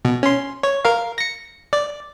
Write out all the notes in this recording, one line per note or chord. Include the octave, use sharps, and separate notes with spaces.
B2
C#4 C6
C#5
A#4 F5
A#6 C#7
D5